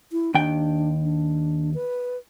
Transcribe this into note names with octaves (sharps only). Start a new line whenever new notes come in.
E4
D#2 D4 G5
D4
B4